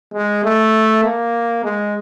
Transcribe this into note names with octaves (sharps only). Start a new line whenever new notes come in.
G#3
A3
A#3
G#3